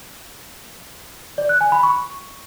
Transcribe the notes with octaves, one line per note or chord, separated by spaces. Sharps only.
D5
F#6
G#5
B5
C#6